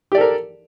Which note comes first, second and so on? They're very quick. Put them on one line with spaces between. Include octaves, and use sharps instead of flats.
G4 D5 A4 A#4